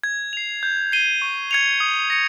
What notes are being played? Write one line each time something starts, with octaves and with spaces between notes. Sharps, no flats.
G#6
C7 F7
G6
C7 D#7 G7
C#6
G#6 C#7 F7
D#6
A#6 C#7